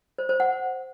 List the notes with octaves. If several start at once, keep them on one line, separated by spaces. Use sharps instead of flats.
C5
C5
F#5